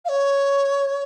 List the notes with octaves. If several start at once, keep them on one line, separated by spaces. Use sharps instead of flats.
F5
C#5